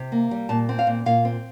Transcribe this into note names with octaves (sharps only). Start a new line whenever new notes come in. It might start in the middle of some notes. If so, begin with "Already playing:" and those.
Already playing: C3
A#3
G3
A#2 A5
C4
F5
A#2
A#2 F5
C4